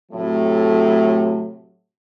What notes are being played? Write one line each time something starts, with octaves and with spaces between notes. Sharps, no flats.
A2 C3 F#3 A3